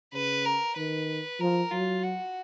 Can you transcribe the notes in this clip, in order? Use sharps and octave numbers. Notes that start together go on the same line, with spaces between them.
C#3 B4
A#4
D#3 B4
F3 A#4
F#3 F4
F#4